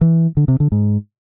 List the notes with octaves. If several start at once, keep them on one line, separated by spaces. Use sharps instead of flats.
E3
D3
C3
D3
G#2